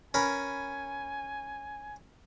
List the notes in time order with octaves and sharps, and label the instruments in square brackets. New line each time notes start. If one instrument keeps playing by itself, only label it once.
[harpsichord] C#4 A#4 B4 [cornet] G#5